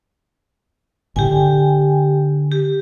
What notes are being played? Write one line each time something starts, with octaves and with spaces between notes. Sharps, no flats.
G1 A2 C#3 G4 G5 G#5
D3
G4